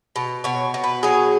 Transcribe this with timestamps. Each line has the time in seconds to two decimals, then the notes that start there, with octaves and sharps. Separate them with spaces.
0.16 B2
0.44 B2 C#5
0.74 B2
0.84 B4
1.03 F#3 G#4